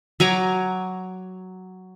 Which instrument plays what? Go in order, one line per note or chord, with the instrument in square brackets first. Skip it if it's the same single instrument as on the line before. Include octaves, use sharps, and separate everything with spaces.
[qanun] F#3 G#5 A#5 D6